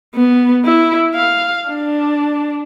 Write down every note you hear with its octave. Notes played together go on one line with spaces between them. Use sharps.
B3
E4
F5
D4